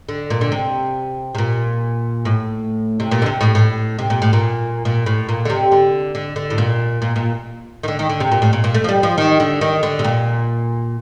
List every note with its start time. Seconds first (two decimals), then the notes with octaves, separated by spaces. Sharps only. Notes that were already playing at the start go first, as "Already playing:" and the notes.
0.09 D3
0.30 A#2
0.41 D3
0.52 C3
1.35 C3
1.38 A#2
2.25 A2
3.00 C3
3.11 A#2
3.22 D3
3.26 C3
3.41 A2
3.55 A2
3.99 C3
4.10 A#2
4.22 A2
4.33 A#2
4.85 A#2
5.06 A2
5.29 A#2
5.45 D3
5.50 C3
5.72 D3
6.15 D3
6.36 D3
6.50 A2
6.58 A#2
7.02 A#2
7.16 A#2
7.83 D#3
7.88 D3
7.99 D#3
8.09 D3
8.20 C3
8.32 A#2
8.42 A2
8.53 A#2
8.64 A#2
8.74 A3
8.84 F3
8.89 G3
9.03 F3
9.18 D#3
9.40 D3
9.61 D#3
9.83 D3
9.99 C3
10.04 A#2